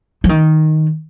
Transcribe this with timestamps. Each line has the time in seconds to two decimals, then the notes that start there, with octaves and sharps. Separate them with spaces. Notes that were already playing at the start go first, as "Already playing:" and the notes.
0.24 F3
0.29 D#3